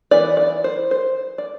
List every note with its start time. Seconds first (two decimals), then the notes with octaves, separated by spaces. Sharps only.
0.11 E3 B3 E4 D5
0.37 D5
0.64 C5
0.91 C5
1.38 D5